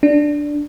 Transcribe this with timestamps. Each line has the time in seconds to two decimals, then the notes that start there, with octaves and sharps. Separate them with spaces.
0.03 D4